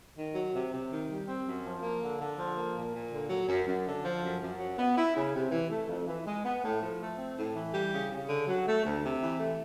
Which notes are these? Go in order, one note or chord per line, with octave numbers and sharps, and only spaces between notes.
D#3
F#3
C3
C3
D#3
G3
C4
F#2
F3
A#3
D3
D3
F3
A#3
A#2
A#2
D3
F#3
F#2
F#2
D3
F3
F#2
F#2
F#3
B3
E4
C#3
C3
E3
A3
F2
E3
G#3
B3
A2
F3
A3
C4
A2
E3
G3
C#3
C#3
D3
F#3
A3
D2
C3
E3
A3